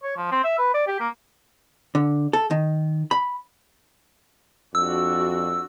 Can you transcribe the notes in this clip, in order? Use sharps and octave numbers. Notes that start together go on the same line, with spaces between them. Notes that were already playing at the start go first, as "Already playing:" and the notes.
C#5
F3
C4
E5
B4
D5
G4
A#3
D3
A4
D#3
B5
F2 D4 F#4 E6